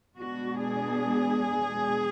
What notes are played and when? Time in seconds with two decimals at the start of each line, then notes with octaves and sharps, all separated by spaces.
0.17 B2 G#3 B3 D4 F#4
0.62 G#4